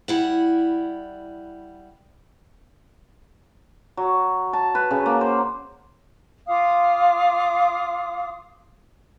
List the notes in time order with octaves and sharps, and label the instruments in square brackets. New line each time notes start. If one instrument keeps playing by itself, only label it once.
[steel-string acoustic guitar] G3 E4 F#5
[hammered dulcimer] F#3
A5
B4
C#3
A#3
C5
[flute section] F4 F5 D6 D#6